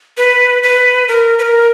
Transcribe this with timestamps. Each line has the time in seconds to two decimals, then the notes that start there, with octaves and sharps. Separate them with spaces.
0.17 B4
0.63 B4
1.08 A#4
1.39 B4
1.42 A#4